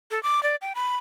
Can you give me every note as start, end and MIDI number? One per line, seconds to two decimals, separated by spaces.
0.11 0.22 69
0.23 0.43 86
0.43 0.56 74
0.62 0.73 79
0.75 0.97 83